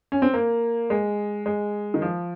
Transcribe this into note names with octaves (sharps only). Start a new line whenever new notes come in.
C#4
C4
A#3
G#3
G#3
D#3
F3